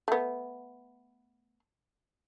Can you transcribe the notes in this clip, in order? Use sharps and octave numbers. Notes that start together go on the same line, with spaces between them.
A3 B3